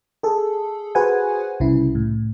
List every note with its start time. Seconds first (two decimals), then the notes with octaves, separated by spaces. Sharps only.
0.23 G#4 A4
0.95 F#4 G#4 B4 C5 F#5 G#5
1.60 C2 C#3 E4
1.95 A2